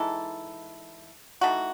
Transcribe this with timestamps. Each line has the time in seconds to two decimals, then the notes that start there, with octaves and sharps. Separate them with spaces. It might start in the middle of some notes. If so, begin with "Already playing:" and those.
Already playing: E3 G#3 D#4 A4
1.41 E3 A3 D#4 F#4